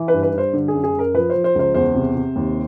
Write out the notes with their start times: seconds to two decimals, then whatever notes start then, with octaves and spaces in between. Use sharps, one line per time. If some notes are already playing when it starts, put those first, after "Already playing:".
Already playing: E3
0.08 B4
0.13 G2
0.23 B4
0.33 G2 C5
0.53 D3
0.68 G#4
0.74 F#2
0.84 G#4
0.94 F#2
0.99 A#4
1.14 F3 B4
1.30 F3 C5
1.44 C5
1.55 C#2 C5
1.74 E2 C5
1.95 C3
2.15 C3
2.36 D#2